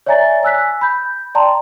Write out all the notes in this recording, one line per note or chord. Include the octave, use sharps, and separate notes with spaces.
C#5 D5 E5 G#5 A#5 A6
G#5 E6 F#6 B6
B5 G6
D5 G5 A5 A#5 C6